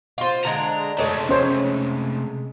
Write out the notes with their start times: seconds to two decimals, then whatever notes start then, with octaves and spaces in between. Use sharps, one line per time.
0.18 F4 C5
0.45 D3 G#3 D4 A#5
0.98 C3 G#3 A3 A4 C#5 D5
1.29 C#4 C5 C#5